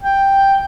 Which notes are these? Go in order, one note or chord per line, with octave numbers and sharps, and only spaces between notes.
G5